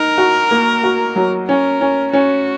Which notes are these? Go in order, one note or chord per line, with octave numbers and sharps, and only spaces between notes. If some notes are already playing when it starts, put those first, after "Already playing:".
Already playing: D#4 A#4
F#4
A#3
F#4
F#3
C#4 A#4
C#4
C#4 F#4